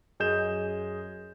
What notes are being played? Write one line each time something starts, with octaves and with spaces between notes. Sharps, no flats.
F#2 G#4 D#5 G6 E7